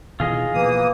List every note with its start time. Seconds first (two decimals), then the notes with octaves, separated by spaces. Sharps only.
0.20 B2 D#3 E3 F4 G#4 D#5
0.54 B2 E3 F3 A#3 D#6